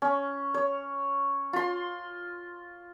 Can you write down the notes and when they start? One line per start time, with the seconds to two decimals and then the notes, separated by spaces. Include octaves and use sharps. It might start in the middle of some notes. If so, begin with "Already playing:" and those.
0.02 C#4
0.54 C#5
1.53 F4 C6